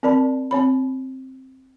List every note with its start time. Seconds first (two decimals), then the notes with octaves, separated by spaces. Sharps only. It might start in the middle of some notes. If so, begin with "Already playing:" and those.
0.03 C4 A#4 D5 A5 B5
0.51 C4 C#5 B5